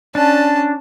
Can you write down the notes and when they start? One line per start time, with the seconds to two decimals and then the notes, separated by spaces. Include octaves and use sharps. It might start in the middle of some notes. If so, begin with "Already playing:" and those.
0.15 C#4 D4 A5